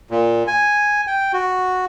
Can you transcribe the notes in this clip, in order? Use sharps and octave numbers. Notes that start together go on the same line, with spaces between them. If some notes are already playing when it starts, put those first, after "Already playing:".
A#2
G#5
G5
F#4